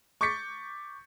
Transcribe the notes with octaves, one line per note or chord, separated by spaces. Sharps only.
C#6 D6 G6 A6 B6 C#7